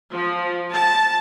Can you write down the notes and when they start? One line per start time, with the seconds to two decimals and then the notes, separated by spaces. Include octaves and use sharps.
0.12 F3
0.72 A5